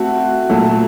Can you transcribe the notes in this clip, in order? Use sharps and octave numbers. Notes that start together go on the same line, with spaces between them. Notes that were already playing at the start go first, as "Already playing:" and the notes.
Already playing: A3 C4 F#4
A#2 F#3 A3